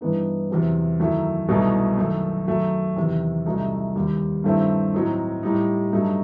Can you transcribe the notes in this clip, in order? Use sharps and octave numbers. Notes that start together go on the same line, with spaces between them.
G2 E3 B3 D#4
E2 C3 F#3 C4
F#2 D#3 F#3 A3 E4
C2 B2 A3 D#4
F#2 D#3 A3
F#2 D#3 F#3 A3
E2 C3 D#3
C2 C3 F#3 A3 D#4
D#2 D#3 G3
G2 D#3 A3 C4 E4
A2 F#3 C4 D#4
A2 G3 D#4
G2 F#3 A3 D#4